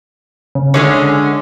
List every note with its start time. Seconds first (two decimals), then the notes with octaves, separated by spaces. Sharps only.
0.55 C#3
0.74 D3 G#3 C#4 C#5